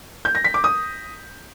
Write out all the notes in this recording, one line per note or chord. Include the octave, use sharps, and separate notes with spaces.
G6
A#6
B6
D6
D#6